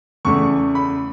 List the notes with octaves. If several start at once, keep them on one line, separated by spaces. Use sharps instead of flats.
E2 C#3 A3 C#6
B5